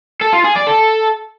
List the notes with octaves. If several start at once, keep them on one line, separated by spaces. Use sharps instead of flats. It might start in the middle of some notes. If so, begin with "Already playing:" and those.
A4
F4
G#4
D5
A4